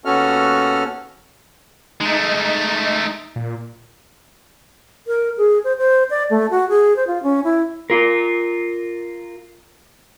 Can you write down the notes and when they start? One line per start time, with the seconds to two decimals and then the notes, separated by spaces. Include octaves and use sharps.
0.05 D#2 B3 C#4 F#4 A4 F6
2.01 G#3 A3 D#4
3.36 A#2
5.07 A#4
5.37 G#4
5.64 C5
5.78 C5
6.10 D5
6.30 A3
6.51 F#4
6.69 G#4
6.96 C5
7.07 F4
7.23 C#4
7.44 E4
7.90 F4 A#4